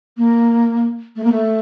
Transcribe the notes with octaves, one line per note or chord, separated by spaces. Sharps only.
A#3
A3
A#3
A3